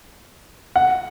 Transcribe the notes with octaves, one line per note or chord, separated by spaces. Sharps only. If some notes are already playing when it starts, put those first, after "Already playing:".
F#5